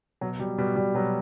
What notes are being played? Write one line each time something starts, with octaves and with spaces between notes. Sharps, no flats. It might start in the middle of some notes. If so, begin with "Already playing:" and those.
B2 F#3
B2 G3
B2 G3
B2 G3
B2 F#3